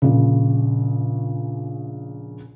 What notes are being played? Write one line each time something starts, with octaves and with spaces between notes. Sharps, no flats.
A#1 C#3